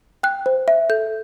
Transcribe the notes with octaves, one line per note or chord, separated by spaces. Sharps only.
G5 F#6
C5
E5
A4 G6